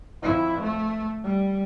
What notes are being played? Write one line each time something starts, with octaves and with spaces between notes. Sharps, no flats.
F2 E4
A3
G3